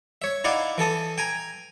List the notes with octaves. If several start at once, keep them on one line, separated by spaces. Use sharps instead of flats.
C#5 E5
D#4 E4 D5 F5 F#5
E3 A4 A5 D#6
G5 G#5 A#5